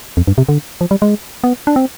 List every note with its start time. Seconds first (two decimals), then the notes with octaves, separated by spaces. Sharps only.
0.17 F2
0.28 G2
0.38 C3
0.49 D3
0.81 F3
0.91 G3
1.02 G#3
1.44 B3
1.67 D4
1.76 C4